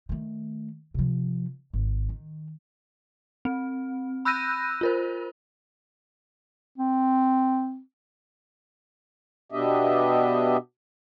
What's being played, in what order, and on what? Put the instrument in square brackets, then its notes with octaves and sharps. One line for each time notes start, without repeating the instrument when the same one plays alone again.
[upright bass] D#3 A3
C3 F3
G#1
D#3
[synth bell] C4
B5 E6 F#6 G6 A#6 D#7
F4 A#4 C5
[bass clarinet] C4
[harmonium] B2 B3 D4 G4 D#5 E5